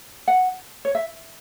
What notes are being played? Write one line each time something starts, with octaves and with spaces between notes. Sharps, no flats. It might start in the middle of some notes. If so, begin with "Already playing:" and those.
F#5
C#5
E5